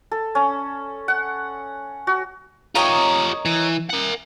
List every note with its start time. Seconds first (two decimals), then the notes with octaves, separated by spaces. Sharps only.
0.11 A4
0.35 C#4
1.08 F#5
2.07 F#4
2.75 F4 G4 A#4 C#5 D#5
3.45 E3
3.89 A#4 F#5